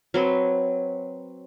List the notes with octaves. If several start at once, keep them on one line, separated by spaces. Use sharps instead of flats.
F#3 C4 B4